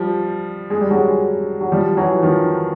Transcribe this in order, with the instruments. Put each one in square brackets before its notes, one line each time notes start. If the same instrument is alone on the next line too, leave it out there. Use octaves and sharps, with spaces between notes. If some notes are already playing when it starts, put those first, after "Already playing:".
Already playing: [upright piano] F3 G3
G#3
G3
F#3 G#3
F#3
F3 G3
E3 F#3
D#3 F3